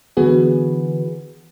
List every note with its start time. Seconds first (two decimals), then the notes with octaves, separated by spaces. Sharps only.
0.17 D3 E3 B3 F#4 G#4 B4